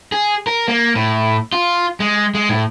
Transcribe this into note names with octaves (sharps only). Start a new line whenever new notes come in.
G#4
A#4
A#3
A2
F4
G#3
G#3
A2